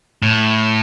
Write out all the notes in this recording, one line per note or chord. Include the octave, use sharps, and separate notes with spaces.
A2